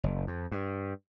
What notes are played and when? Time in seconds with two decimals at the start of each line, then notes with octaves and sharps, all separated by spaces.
0.04 F#1
0.27 F2
0.52 G2